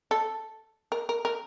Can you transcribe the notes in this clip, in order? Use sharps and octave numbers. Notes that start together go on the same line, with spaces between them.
A4
A#4
A#4
A#4